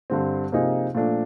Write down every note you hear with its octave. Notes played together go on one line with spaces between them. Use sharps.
G2 D3 G3 C4
C3 F3 A#3 D#4 G#4
A#2 F3 A3 D4